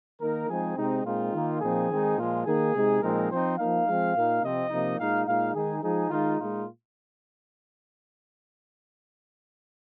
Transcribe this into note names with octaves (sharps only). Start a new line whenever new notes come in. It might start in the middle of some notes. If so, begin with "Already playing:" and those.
D#3 A#3 D#4 A#4
F3 G#3 C4 D#4 G#4
C3 G#3 C4 D#4
A#2 G#3 C4 D#4 F4
D#3 A#3 D#4
A#2 F3 C4 D#4 G#4
D#3 G#3 C4 D#4
A#2 F3 G#3 F4
D#3 A#3 D#4 G#4
C3 G#3 D#4
A#2 F3 G#3 C4 D#4 A#4
F3 C4 D#4 C5
F3 A#3 D#4 F5
F3 G#3 C4
A#2 A#3 D#4
C3 F3 C4 D#5
C3 F3 A#3 D#4
A#2 G#3 D#4 F5
A#2 G#3 D#4 F5
D#3 G#3 D#4 G#4
F3 G#3 D#4 G#4
D#3 G#3 D#4 F4
A#2 G#3 D#4 F4